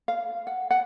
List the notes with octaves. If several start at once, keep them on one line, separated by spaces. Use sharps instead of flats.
F5
F#5
F#5